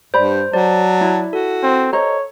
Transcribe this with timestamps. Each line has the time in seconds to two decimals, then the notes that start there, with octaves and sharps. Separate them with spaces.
0.14 G2 C5 D5 B5
0.53 F#3 C5 D5 A5
1.01 E4
1.33 F#4 A4
1.63 C4
1.93 C5 C#5 D#5 A#5